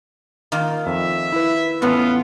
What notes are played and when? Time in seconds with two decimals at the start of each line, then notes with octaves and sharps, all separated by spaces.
0.52 D#3 A#3 F4
0.86 F2 E5
1.32 E4 B4
1.82 E2 A2 B3 C#4 F4